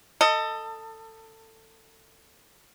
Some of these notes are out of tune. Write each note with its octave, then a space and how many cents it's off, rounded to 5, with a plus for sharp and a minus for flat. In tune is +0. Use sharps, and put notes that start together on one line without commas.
A4 +20 D#5 +0